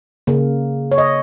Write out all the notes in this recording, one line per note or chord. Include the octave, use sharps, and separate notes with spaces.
C#3 A#3
C#5
D#5